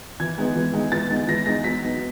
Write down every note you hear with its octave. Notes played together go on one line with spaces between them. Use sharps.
E3 G#6
G#3 B3 D#4
E3
G#3 B3 D#4
E3 A6
G#3 B3 D#4
E3 A#6
G#3 B3 D#4 A#6
F#3 B6
B3 D#4